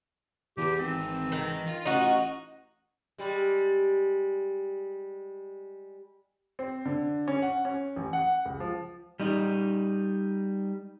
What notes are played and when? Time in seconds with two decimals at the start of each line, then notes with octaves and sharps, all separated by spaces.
0.58 E2 E3 G4
0.79 G#1 C4
1.32 D#3
1.67 F4 F5
1.85 A1 D#4 F#4 D#5
3.18 G3 G#3
6.59 C4
6.86 D3
7.28 C#4
7.42 F#5
7.65 C#4
7.96 A1
8.13 F#5
8.46 C#2
8.60 F3
9.20 G3 D#4